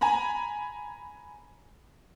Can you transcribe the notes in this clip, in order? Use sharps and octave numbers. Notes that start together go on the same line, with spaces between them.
G#5 A#5 B5